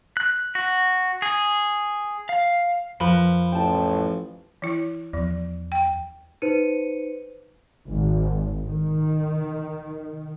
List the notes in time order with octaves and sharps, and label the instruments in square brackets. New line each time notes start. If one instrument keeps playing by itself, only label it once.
[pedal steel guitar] F#6
F#4
G#4
F5
[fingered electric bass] F2 [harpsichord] F3 [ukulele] A#4 B4 B5
[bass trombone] A1 [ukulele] G5 A5
[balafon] E3 E4
[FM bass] E2 [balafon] F3
[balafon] G5
[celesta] D#4 B4 C5 C#7 D#7
[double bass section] G#1
D#3